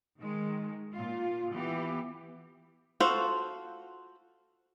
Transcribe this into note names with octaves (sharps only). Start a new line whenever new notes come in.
D#3 G#3
A#2 F4
E3 B3 G4
F4 F#4 A4 C5